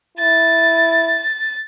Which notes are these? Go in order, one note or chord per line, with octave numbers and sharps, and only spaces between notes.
E4 A6